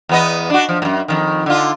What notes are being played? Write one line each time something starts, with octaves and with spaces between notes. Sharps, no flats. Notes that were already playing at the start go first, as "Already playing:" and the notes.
E2 B3 D#5
D4 F#4
F3
F#2 A2
F2 G#2 D#3
D3 F4